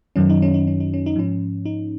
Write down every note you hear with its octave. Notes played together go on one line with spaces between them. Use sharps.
F#2 D#3 F#3 C#4
D#4
C#4
D#4
C#4
D#4
C#4
D#4
G#2 F3 C#4
D#4